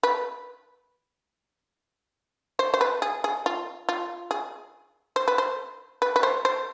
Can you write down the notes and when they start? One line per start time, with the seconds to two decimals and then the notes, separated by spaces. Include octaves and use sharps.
0.03 B4
2.59 C5
2.74 C5
2.81 B4
3.02 G#4
3.24 G#4
3.46 F4
3.89 F4
4.31 G#4
5.16 C5
5.28 B4
5.38 C5
6.02 B4
6.16 B4
6.23 C5
6.45 C5